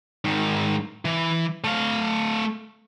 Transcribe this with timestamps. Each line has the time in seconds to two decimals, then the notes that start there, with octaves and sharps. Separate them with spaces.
0.25 G#2 D#3
1.05 E3
1.64 A3 F5